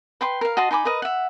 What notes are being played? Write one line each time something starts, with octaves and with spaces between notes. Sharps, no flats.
B4 G5 C6
A#4 F5
F#4 D#5 A5 C6
D#4 G#5 B5 D6
A#4 B4 D#5
E5 F#5